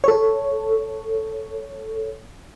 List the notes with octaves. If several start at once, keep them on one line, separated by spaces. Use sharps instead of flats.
A4 C#5